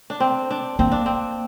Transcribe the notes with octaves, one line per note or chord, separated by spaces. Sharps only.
D4
C4
D4
A#3 C4
D4
C4